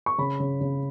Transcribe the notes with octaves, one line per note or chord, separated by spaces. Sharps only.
C#6
C#3 B5
C#3
C#3